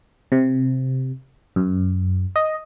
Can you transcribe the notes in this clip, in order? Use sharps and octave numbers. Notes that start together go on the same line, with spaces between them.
C3
F#2
D#5